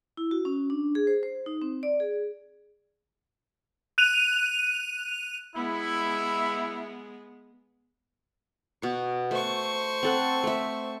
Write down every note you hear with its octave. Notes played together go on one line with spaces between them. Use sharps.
E4
F#4
C#4
D4
G#4
C5
C5
D#4
C4
D5
G#4
F#6 D#7 F7
G#3 B3 E4
B2 C#6
A3 C5 C#6
C4 A4 F#5
A3 E5